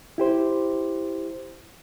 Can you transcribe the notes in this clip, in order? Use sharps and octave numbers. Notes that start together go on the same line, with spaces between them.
E4 G4 C5